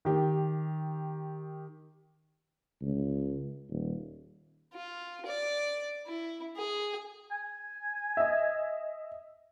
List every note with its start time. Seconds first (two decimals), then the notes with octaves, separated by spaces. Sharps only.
0.05 D#3 G4
2.82 C#2
3.69 D#1
4.74 F4
5.26 D5
6.07 E4
6.57 G#4
7.31 G#5
8.17 D#5 E5